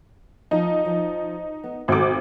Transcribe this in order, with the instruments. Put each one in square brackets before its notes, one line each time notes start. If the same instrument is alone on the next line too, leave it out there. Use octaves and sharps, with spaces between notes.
[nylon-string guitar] F3 [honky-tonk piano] D#4
[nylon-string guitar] F3
B3
[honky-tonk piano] G#1 D6 [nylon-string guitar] F#4 A4